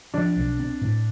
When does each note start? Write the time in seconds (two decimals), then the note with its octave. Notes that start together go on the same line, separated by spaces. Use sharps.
0.14 F3 D4
0.36 B1
0.60 C4
0.81 A2